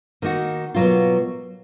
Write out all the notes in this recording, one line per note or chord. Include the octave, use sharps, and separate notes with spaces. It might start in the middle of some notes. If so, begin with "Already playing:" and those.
D#3 A#3 D#4 F#4
B2 F#3 A#3 F4